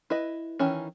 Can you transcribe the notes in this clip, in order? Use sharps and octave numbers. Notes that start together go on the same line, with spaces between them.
E4 B4 D#5
D#3 E3 C#4